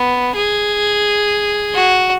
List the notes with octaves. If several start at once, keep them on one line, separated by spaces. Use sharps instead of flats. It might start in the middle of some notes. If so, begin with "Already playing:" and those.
Already playing: B3
G#4
F#4